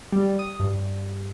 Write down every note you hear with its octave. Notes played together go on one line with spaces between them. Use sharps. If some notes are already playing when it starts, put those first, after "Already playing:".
G3
D#6
G2